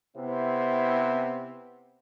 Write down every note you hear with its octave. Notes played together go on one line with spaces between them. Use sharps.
C3 B3 C4 E4